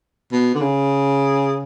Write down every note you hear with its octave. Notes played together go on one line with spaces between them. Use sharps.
B2
D3
C#3